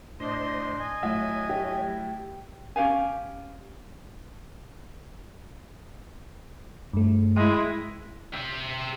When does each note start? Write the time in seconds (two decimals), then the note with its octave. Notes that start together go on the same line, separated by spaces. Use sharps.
0.20 A2 D4 C5 D#5 C6
0.79 D#5 G#5
1.03 A2 F#3 E5
1.49 G4
2.76 C#4 G4 F5 G#5
6.93 G2 A3
7.36 G#3 E4
8.34 G4 E5